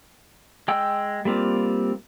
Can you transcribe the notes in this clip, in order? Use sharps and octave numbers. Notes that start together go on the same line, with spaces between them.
G#3 G5 E6
G3 A#3 C4 F4